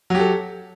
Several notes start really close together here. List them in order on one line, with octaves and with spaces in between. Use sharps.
F#3 G4 A4